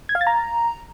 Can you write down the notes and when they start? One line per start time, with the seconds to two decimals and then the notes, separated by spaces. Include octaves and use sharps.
0.09 G#6
0.15 F5
0.21 A6
0.27 A#5